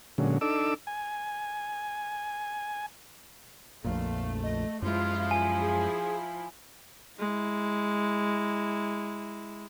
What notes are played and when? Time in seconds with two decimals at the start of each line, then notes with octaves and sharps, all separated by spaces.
0.18 A#2 D3 F#3 G#3 C#4
0.41 D4 D#4 A4 D6 E6
0.87 G#5
3.84 A#1 F2 A#2 A3 F5
4.43 D#5
4.82 F#2 F3 G#3 E4 F4
5.31 G#5
5.60 G#4
7.19 G#3 E4